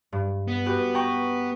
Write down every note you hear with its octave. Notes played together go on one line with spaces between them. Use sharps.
G2
B3
F#4 G4 B4
G5 A#5 C#6